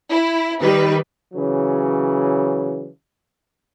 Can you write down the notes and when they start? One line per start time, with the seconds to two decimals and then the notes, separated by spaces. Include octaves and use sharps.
0.11 E4
0.61 D#3 G3 B4
1.33 C#3 E3 F#3